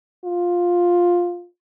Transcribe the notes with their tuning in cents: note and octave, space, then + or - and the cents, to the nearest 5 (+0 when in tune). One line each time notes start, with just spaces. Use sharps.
F4 +10